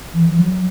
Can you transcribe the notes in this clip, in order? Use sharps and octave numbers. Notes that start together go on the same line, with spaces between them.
E3
E3
F#3